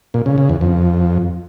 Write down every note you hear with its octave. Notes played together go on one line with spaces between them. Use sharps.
A#2
C#3
C#3
E2
F2